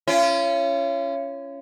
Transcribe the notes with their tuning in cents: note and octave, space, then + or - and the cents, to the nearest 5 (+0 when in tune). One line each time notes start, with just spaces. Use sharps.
C#4 +0 F4 -45